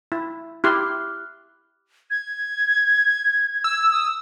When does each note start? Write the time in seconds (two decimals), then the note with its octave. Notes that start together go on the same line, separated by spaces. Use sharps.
0.12 E4
0.64 E4 G4 C6 D6 F6 F#6
2.10 G#6
3.64 E6
3.91 D#6